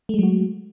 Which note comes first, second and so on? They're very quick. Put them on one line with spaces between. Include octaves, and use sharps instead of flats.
A3 G#3 F#3 F#4